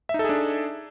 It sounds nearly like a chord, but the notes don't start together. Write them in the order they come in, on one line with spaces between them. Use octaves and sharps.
E5 D#4 A4 G#4 D4